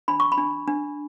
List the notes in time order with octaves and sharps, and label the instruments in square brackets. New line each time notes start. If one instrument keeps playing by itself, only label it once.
[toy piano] D4 B5
C#6
B5
D4
D4